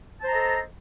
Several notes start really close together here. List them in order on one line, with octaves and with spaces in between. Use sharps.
A5 C5 A#5 D#5 A4